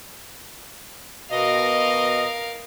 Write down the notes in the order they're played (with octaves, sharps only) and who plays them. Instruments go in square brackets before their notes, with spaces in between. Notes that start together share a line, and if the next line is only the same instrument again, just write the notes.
[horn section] B2 D#5 [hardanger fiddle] A#4 F5